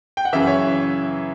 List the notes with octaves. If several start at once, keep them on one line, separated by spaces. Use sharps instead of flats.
G5
F#5
F#2 C#3 E3 E5
C#5